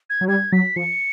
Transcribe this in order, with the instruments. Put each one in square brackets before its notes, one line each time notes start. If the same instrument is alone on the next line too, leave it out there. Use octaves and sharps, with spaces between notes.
[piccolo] G#6
[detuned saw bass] F#3
[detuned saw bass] G3 [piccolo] G#6
[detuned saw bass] F#3 [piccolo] B6
[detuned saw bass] F3 [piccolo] C#7